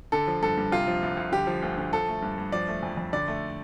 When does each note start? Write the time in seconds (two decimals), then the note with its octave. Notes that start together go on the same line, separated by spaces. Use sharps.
0.12 D3 A4
0.27 F3
0.42 G2 A4
0.57 G2
0.72 C3 F4
0.87 F3
1.03 C2
1.17 C2
1.32 D3 G4
1.47 F3
1.62 D2
1.77 D2
1.93 F3 A4
2.08 A3
2.22 G2
2.38 G2
2.52 F3 D5
2.68 A3
2.83 F2
2.97 F2
3.13 D3 D5
3.28 A3